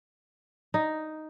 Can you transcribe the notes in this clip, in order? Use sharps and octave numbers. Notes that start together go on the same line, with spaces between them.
D#4